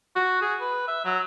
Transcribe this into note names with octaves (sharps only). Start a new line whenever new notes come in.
F#4
G#4
B4
E5
F#3